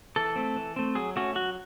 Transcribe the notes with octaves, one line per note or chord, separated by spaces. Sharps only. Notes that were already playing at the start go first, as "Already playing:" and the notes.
E3 A4
A3 C4
E3
A3 C4
F#3 G#4
A3 C#4 F#4
F#3 F#4